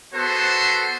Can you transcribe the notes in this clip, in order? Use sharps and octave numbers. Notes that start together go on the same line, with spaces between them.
B3 F#4 G#4 A4 C5